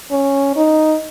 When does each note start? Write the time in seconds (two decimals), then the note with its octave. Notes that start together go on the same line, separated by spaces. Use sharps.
0.11 C#4
0.56 D#4